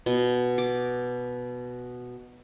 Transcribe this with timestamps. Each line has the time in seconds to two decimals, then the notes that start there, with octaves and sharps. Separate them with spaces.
0.06 B2
0.58 D6